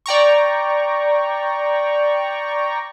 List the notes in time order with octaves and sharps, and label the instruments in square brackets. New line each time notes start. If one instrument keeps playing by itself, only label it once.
[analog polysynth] D5 G5 A#5 C#6